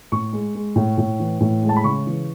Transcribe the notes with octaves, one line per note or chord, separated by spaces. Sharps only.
A2 C#6
G#3
G#3
A2
A2
E3
A2
G#3
A5
B5
C#3 C#6
E3